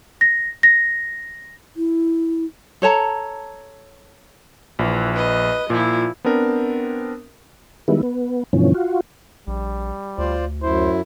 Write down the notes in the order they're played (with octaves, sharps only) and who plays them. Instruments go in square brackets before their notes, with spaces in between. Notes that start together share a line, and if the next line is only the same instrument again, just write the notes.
[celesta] A#6
A#6
[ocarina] E4
[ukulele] A4 C#5 A5 A#5
[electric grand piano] A#1 [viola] E3
[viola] B4 D#5
[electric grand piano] A#2 [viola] F3 E4
[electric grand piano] B3 C4 D4 A#4
[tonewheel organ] D#3 G3 G#3 B3 E4
B3
G2 B2 D3 E3 F3 C#4
F4 F#4
[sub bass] A#1 [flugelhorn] G3
[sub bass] D2 [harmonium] F4 C5 D5
[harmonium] F#2 E4 [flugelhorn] C5